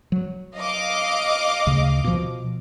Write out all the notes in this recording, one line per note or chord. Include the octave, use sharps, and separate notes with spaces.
F#3
D#5 F5 D6
D2 C#3
B2 F3